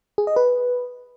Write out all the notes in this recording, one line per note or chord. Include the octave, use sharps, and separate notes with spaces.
G#4
D#5
B4